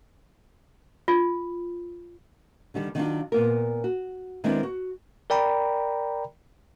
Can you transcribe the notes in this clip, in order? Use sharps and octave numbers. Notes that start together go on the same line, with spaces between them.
F4
D3 D#3 G3
D#3 F#3 D4 F4
A#2 B3 A#4
F#4
D#3 G#3 B3 C4 D4 E4
F#4
A#4 D5 G5 A#5 B5